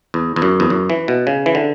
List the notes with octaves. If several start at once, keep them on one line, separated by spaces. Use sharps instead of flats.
E2
E2
F#2
E2
F#2
E3
B2
C#3
E3
D3